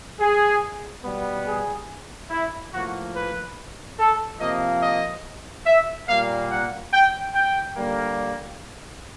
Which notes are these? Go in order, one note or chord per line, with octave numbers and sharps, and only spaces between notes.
G#4
B2 G3 B3
G#4
E4
A2 F3 A#3 F#4
B4
A4
C3 F3 A#3 D#5
D#5
E5
A#2 G3 A#3 F5
F#5
G5
G5
D3 G3 A#3